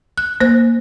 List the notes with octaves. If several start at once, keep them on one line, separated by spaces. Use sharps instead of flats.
F#6
A#3 C5 F#6